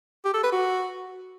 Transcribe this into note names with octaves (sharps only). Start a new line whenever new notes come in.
G4
A4
B4
F#4